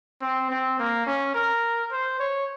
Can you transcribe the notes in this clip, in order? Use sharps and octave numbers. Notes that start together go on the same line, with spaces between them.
C4
C4
A#3
C#4
A#4
C5
C#5